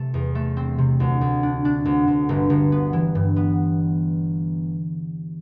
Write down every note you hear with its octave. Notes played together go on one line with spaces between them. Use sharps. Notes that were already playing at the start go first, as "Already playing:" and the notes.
Already playing: C3 A3
E2
A3
C4
C3
D2
D2
D4
D4
D2
D2
G1
G1
B3
E3
G2
B3